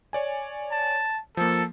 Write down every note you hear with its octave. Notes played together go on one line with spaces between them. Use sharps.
C#5 D5 G#5
A5
F3 A#3 A4